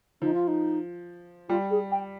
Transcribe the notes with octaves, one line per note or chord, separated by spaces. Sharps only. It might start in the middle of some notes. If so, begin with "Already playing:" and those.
F3 D#4
F4
D#4
G3 F4
G#4
G5